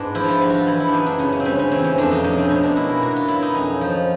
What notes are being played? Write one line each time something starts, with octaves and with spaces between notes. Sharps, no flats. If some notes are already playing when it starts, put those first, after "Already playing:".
Already playing: G#2 G#3 B3 D4 G#4
F3 E4
F4
G3
F4 F#4
E3 E4
E4
D4
F#2 D#4
D4
C#3 C#4
C#4
C4
G3 C#4
C#4
E3 C4
C#4
F2 D4
D#4
C3 C#4
C4
B2 C#4
D4
A#3 E4
A#4
B2 F#4
F4
F#3 E4
D#4
F2 C#4
F3